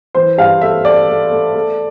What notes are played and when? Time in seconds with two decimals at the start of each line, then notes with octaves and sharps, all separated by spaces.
0.15 E3 C5
0.38 G2 F5
0.61 A3 E5
0.85 A3 D5
1.09 A3
1.31 A3
1.55 A3